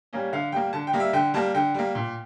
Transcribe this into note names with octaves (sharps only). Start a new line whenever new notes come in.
G3 A#3 C#4
D3 F5
G3 A#3 G5
D3 A5
G5
G3 A#3
E5
D3 G5
G3 A#3 A5
D3 G5
G3 A#3
A#2